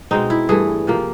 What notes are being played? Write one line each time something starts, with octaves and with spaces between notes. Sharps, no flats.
B2 G#3 C4 D#4
E4
G2 E3 A3 G#4
C3 F3 A#3